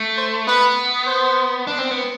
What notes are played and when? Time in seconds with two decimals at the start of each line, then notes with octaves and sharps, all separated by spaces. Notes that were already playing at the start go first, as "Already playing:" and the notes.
Already playing: A3
0.17 C5
0.47 B3 B4
1.07 C5
1.67 D4
1.79 C4
1.91 B3